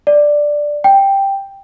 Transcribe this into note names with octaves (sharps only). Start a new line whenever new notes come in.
D5
G5